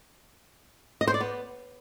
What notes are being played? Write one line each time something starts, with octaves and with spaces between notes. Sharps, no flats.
D#5
C5
D5
B3